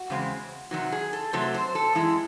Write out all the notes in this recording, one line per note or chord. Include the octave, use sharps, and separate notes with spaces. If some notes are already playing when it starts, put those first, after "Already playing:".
Already playing: F#4
E2 C#3 G#3 C4
C3 D#3 F#3 F#4
G#4
A4
C3 F#3 A3 C4 A4
C5
A4
F#2 E3 G#3 E4